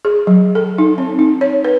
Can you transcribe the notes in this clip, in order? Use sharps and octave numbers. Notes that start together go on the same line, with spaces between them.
G#4
F#3
A4
D#4
C4
D#4
C#5
B4